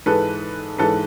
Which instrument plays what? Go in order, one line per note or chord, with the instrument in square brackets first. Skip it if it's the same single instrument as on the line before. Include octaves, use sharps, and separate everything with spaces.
[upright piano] G#2 E3 G#3 A4 B4
G#2 E3 G#3 A4 B4